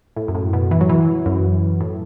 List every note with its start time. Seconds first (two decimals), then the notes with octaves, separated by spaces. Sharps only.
0.16 A2
0.28 F#2
0.35 A2
0.53 B2
0.71 E3
0.81 F#3
0.89 E3
1.26 F#2
1.80 A2